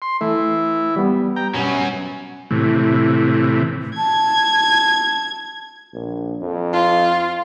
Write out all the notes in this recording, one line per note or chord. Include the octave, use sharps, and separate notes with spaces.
C6
E3 A3
G3 B3
G5 A#5
B2 F#3 C#4
A2 C3 E3
A5 G#6
A#1
F2
F4